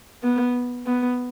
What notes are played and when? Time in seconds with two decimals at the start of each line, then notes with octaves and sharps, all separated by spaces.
0.23 B3
0.87 B3